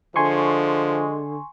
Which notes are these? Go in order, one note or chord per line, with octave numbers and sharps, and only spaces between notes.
D3 F3 G#3 G#5 C6 C#6